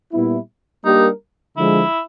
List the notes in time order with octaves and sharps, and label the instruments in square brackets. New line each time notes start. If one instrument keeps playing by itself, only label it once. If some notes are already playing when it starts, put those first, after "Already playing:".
[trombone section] A#2 G3 B3 E4
[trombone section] G3 A#3 D4 G4 A#4 [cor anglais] D#4
[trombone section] D3 F3 G#3 [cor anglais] E4